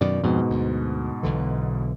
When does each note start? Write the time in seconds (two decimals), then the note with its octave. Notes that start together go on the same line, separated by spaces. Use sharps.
0.01 F#2 B2 D#3 D5
0.23 F2 G#2 B2
0.50 D2
1.23 B1 D3 E3